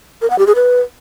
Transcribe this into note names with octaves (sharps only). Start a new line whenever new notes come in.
A#4
F#5
G4
G#4
B4